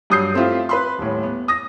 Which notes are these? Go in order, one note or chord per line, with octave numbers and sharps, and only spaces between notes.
G2 F#3 D#6 G6 C7
A3 C4 E4 F4 G4
B4 B5 C6
D#1 A2
B3
D#6 A#6